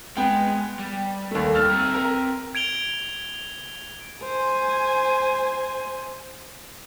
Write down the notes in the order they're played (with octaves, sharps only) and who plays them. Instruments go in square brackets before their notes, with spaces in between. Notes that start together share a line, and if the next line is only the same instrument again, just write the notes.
[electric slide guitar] G#3 [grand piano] B3 G5
[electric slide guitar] G3
[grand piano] D#2 A3
[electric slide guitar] G3 [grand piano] E6 F6 A6
[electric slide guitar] C4 A#5
[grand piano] A#4
[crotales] G#6 D7 F7 G7
[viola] C5 G#5